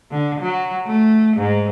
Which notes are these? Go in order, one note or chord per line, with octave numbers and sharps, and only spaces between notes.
D3
F#3
A3
G#2